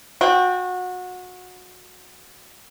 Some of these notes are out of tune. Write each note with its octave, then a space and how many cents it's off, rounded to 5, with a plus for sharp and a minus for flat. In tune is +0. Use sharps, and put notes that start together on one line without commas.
F#4 -25 G5 +0